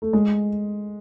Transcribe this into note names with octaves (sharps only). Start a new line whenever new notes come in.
A3
G#3